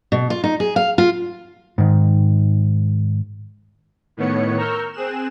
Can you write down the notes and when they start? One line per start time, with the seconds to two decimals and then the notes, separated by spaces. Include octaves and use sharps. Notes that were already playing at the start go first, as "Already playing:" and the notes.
0.12 B2
0.30 F4
0.44 D#4
0.60 G#4
0.76 F5
0.98 F4
1.78 G#2 D#3
4.17 A2 D#3 B3 C#5 C#7
4.57 A#4 A#5 C#6 E6 F6 G6
4.93 C4 G#4 F#6 E7